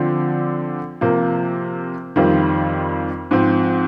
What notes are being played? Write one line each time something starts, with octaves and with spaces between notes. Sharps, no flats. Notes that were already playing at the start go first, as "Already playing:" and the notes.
Already playing: D3 F3 C4
C3 F3 A#3
F2 D#3 G3 C4 F4
G#2 F3 C4